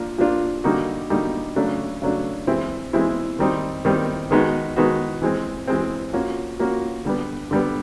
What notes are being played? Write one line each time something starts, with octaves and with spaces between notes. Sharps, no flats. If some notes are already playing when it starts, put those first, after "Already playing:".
Already playing: F3 A#3 D4 F4
F3 A#3 D4 F4
D3 G3 A#3 D#4 F#4
D3 G3 A#3 D#4 F#4
C#3 F#3 A3 D4
C#3 F#3 A3 D4
E3 G#3 C4 E4
E3 G#3 C4 E4
D#3 G3 C4 D#4
D#3 G3 C4 D#4
D#3 G#3 B3 D#4 F#4
D#3 G#3 B3 D#4 F#4
E3 G#3 C4
E3 G#3 C4
F3 A#3 C#4 F#4
F3 A#3 C#4 F#4
D3 G3 B3
D3 G3 B3